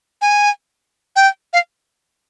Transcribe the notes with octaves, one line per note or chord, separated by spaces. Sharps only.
G#5
G5
F5